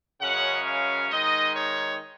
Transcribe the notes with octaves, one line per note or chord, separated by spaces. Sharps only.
F#2 C#3 G#3 C#4 F#5
F5
D#3 G#3 D#4 D#5
C#5